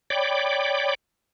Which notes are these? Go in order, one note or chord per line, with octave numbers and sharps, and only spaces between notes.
C#5 D5 G5 B5 D6